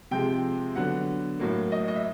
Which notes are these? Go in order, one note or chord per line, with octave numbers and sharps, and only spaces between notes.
C3 F3 G#3 G5
D3 F#3 B3 F#5
A2 F#3 A#3
D#5
D#5
E5